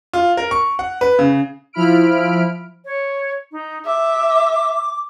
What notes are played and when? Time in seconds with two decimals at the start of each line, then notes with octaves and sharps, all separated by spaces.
0.13 F4
0.37 A#4
0.51 C#6
0.79 F#5
1.01 B4
1.19 C#3
1.73 F3 E4 B5 F6 D7
2.85 C#5
3.52 D#4
3.86 E5 D6